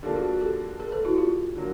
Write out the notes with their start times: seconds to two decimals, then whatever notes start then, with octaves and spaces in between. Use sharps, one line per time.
0.03 D3 F3 A#3 D4 G4 A4
0.16 F#4 G#4
0.28 F#4 G#4
0.41 G4 A4
0.80 G#4 A#4
0.92 A4 B4
1.05 E4 F#4
1.18 F4 G4
1.55 D3 F#3 A#3